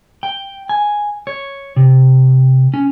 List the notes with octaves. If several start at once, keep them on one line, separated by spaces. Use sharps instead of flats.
G5
G#5
C#5
C3
C#4